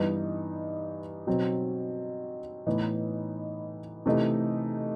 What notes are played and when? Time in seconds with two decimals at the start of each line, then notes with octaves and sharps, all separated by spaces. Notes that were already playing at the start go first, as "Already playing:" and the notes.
Already playing: G2 E3 B3 D#4
1.27 B2 F#3 C4
2.67 A2 E3 B3 D#4
4.06 C3 E3 A3 D#4